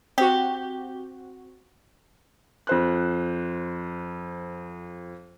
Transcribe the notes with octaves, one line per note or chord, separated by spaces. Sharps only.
C4 F#4 G4
F2 C5 F#6